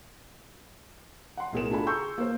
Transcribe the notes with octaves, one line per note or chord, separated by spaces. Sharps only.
F#5 C6
B1 A2 G#4 A#4 E7
D4 F4 A4 G#5 B5
G#4 A#5 C6 C#6 E6 G6
A#3 C5